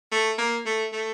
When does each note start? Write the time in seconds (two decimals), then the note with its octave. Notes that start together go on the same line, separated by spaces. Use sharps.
0.12 A3
0.38 A#3
0.66 A3
0.93 A3